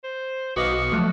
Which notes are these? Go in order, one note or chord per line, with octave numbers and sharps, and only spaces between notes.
C5
B1 B3 F#4 D#5 F5 C#6 D6
F3 F#3 A3 D6